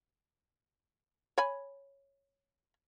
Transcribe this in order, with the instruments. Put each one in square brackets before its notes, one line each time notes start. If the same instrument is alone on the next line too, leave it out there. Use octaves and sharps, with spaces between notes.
[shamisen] C#5 G#5 B5